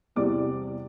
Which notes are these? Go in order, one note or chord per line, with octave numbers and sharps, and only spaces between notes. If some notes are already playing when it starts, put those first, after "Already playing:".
E2 C3 G3 C4 E4 D5 D6